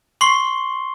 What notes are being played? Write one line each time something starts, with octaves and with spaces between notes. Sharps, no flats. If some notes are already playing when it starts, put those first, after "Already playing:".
C6 C#6 C7 G7